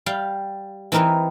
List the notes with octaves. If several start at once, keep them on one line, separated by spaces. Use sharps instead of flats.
G3 F5
E3 C4 D#4 A#4 B4 C#5